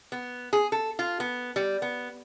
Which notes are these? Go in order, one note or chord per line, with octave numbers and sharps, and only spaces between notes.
B3
G#4
A4
F4
B3
G3
B3